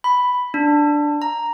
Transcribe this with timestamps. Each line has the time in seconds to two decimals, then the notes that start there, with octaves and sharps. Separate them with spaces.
0.04 B5
0.54 D4
1.22 A#5